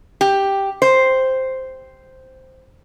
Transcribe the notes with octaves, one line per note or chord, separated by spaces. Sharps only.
G4
C5